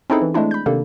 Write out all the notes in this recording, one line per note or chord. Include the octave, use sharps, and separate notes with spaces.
C4 C#4 D#4 E4 G#4 A4
E3
G#3 A3 C4 D4 E4
B5 G6
C3 D#3 A#3 D4 A4